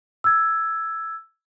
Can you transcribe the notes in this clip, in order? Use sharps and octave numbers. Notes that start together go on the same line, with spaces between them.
E6 G#6